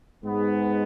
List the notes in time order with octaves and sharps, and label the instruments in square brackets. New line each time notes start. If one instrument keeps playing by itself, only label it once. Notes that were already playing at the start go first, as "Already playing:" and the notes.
[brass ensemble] G#2 G#3 B3